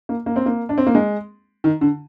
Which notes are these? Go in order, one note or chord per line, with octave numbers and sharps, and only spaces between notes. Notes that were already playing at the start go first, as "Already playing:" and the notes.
A#3
A#3
C4
A#3
D4
C4
A#3
G#3
D#3
D3